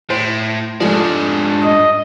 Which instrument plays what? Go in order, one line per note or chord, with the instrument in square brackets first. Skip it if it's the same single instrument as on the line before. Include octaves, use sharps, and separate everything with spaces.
[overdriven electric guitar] A2 [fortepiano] C5
[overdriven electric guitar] G#2 D4 [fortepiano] F3 G#3 A3
[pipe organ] D#5